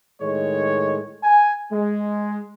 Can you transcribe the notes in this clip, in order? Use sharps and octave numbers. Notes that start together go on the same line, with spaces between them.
A2 D#3 G#3 C#5
G#5
G#3